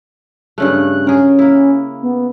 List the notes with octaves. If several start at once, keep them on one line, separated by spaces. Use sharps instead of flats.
G2 C#3 A3 F#6
C#4 G#4 A#4
A#3 E4
B3